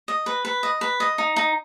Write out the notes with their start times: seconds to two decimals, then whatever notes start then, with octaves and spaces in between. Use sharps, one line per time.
0.08 D#5
0.26 B4
0.45 B4
0.63 D#5
0.81 B4
1.00 D#5
1.18 D#4
1.36 D#4